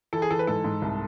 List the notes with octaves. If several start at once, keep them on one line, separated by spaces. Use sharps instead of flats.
E3 A4
G#4
E3 A4
B4
G#2 A4
G#2
C2